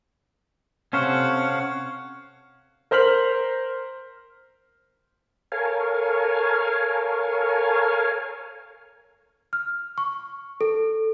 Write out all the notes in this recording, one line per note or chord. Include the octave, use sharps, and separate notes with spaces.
C3 C#4 A4 C5 C#5 F5 F#5
A#4 C5 F6 B6 F#7
A4 A#4 C#5 F5 G#5
F6
C#6
A4